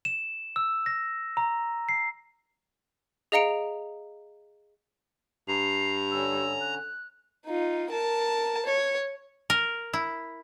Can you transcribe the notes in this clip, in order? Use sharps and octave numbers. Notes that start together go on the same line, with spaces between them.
E7
E6
A#6
A#5
C7
G#4 D#5 F5 A#5 C#7 D7
G2 A#5 C7
D3 C#4 E6
F#6
D#4 F4
A#4 A5
C#5
A#4
E4